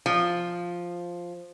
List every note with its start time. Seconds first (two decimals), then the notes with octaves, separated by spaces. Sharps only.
0.06 F3